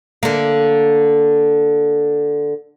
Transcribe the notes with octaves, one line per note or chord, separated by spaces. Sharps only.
D3 A#3